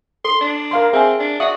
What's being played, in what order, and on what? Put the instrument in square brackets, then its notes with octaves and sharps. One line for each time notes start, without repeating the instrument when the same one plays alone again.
[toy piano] A4 [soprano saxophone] C6
[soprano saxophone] D4
[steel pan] A#4 F5 C6
[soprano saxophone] C4 [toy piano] G#4 G#5 [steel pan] E5
[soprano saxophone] D4
[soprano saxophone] F#4 [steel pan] D5 D#6 [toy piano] E5